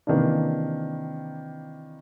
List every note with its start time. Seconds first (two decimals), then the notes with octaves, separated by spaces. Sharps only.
0.07 C3 D#3 E3 A#3 D4